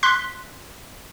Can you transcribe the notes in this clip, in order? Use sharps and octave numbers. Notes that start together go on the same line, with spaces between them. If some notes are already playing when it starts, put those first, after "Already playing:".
C6 F#6 B6